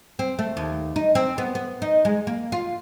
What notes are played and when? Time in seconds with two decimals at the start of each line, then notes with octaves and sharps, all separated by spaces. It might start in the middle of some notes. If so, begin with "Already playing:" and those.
0.19 C4
0.39 A3
0.57 D#2
0.96 D#4
1.15 C4
1.38 B3
1.55 B3
1.82 D#4
2.05 G#3
2.27 A#3
2.52 F4